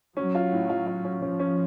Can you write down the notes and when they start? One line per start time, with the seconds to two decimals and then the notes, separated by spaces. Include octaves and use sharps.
0.16 F#3 C#4
0.35 F4
0.52 A2
0.69 F4
0.87 F4
1.05 C#4
1.22 F3 C#4
1.40 C#4